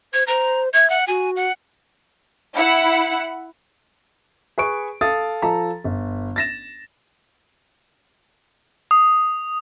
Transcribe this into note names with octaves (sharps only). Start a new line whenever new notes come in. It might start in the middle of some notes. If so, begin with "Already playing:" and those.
C5 G#6
C5 A#5
E5 G#6
F#5
F#4 G#5
F#5
E4 F#5
G#4 B4 C#6 D7
A4 F5 D#6 A6
F3 A4 A5 A#5
G1
A6 A#6 E7
D#6